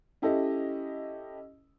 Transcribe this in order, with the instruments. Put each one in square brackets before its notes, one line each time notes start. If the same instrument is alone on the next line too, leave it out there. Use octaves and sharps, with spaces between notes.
[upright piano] C#4 E4 G4 A4 D#5